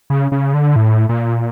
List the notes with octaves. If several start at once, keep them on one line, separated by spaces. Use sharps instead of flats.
C#3
C#3
D3
A2
A#2